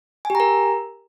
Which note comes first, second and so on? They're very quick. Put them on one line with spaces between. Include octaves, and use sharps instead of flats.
G#5 G4 A#5 A#4